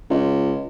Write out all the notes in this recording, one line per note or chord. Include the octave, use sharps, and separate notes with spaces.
C#2